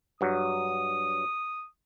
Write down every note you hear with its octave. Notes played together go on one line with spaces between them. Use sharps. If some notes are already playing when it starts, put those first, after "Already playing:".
G2 F#3 D#6